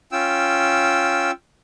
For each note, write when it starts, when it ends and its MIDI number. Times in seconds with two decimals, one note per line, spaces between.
0.12 1.31 61
0.12 1.31 65
0.12 1.31 79
0.12 1.31 88